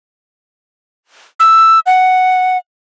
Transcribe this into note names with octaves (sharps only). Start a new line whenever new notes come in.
E6
F#5